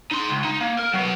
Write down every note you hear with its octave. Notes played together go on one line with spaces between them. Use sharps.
D#4 C6
C#2
D#4
A#3
A#4
F#3 B3